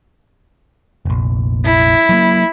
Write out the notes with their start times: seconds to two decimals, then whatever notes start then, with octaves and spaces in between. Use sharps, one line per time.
1.05 F1 A#1
1.65 E4
2.09 F#3 G3 A#3